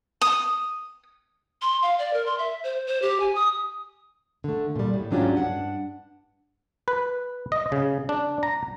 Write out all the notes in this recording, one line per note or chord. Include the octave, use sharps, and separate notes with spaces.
D#6
C6
F5
D5
A#4
C6
E5
C5
C5
G4
G#5
D#6
D3 A3
A#2 G3
A2
G#2 F#3 C#4 D4 F4 G4
G2 D#3 D4 F#5
B4
D#5
C#3
D4
A#5